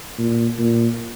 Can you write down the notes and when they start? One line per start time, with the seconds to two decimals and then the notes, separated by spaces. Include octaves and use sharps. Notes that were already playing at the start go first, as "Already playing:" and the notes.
0.19 A#2
0.59 A#2